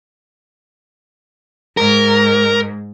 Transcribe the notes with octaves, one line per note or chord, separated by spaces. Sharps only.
G#2 A#4